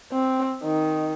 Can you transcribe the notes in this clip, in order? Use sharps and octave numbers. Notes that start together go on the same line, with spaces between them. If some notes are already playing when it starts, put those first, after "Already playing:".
C4
D#3